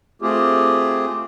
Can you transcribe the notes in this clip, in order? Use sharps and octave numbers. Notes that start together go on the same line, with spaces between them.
A3 C4 F4 G4 G#4